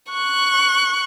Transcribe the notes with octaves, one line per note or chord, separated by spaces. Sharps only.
C#6 F#6